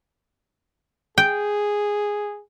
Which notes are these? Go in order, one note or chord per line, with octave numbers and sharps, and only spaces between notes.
G#4 G5